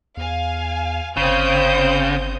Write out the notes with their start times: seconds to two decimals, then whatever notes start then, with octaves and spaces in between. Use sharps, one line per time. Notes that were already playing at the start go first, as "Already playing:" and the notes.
0.17 E2 F5 G#5
1.17 G1 C#3 C4 D#6 G6